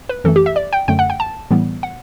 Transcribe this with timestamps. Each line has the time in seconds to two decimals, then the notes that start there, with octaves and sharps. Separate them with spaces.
0.09 B4
0.24 F#2 E3 A3 A4
0.36 G4
0.46 E5
0.56 D5
0.73 G5
0.88 F#2 D3 A3 G5
0.99 F#5
1.10 G5
1.20 A5
1.51 A2 E3 G3 B3
1.83 F#5